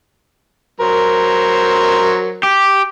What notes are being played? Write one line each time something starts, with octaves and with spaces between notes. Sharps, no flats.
F#3 A#4 C5
G4